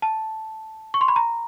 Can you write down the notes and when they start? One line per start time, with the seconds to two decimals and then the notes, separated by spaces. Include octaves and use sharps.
0.02 A5
0.94 C#6
1.01 C6
1.08 B5
1.16 A#5